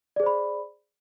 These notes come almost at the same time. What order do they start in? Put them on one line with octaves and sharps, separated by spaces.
D5 G#4 C5 B5